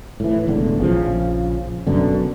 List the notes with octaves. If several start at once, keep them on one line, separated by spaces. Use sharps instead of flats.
A2 E3
E1 E2 A2 D3
A#1 C#3 F3
F#1 F#2 B2 D3